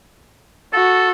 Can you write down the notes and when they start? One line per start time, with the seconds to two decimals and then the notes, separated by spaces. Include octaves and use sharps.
0.73 F#4 A4